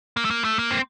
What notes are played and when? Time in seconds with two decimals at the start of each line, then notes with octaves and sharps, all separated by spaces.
0.17 A#3
0.25 A3
0.31 A#3
0.44 A3
0.59 A#3
0.71 C4